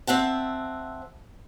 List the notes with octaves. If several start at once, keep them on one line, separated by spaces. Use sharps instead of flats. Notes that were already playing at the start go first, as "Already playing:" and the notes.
C4 E5 F#5 A5